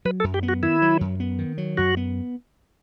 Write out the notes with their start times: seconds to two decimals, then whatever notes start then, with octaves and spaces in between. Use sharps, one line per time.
0.05 F#3 B4
0.20 A4
0.24 F#2
0.34 G4
0.43 B3
0.49 F#4
0.62 D#3 E4
0.82 F#3
1.01 F#2
1.20 B3
1.39 D#3
1.58 F#3
1.77 F#2 F#4
1.97 B3